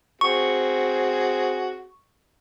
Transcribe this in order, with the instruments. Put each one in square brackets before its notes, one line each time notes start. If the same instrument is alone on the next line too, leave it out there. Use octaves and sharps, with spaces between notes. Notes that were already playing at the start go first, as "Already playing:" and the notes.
[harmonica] C4 F#4 G#4 [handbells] C#6